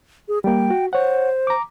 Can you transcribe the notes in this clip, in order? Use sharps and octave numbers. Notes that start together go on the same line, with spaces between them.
G#4
G3 A#3 G5
F#4
C5 C#5 F#5
A#5 D6